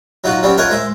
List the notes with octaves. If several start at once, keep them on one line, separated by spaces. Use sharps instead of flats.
F#3 D#4 F4 F#4
F#3 G3 C4 C#4
F4 G#4 A#4 C#5 D#5 F#5
G#3 C5 E5